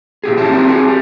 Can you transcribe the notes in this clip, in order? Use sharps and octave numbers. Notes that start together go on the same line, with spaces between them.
A#2 G4 G#4
C2 F3 C#4 E4 G4 A5
G3 C4 D#4 A#4
F#4 G#4
G3